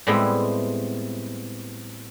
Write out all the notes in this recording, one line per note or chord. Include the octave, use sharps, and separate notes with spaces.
A2 G3 G#3 B3 C4 E4